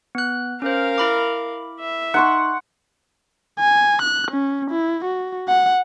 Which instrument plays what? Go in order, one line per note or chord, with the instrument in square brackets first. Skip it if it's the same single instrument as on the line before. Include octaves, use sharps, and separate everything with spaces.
[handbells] B3 F#6
[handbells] C#4 C5 [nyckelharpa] A#4 F5
[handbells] E4 B5 D6
[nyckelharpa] E5
[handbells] D#4 [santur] F#5 C6 C#6
[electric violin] G#5
F#6
C#4
E4
F#4
F#5